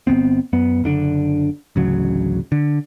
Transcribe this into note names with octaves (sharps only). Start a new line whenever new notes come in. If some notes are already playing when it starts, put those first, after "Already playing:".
G1 A#2 B3 C4
F#2 B3
F#1 D3 D4
A1 D2 C#3 F#3
D3